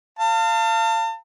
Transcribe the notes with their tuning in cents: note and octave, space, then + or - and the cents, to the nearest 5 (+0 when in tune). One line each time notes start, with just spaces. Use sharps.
F5 -15 A5 +40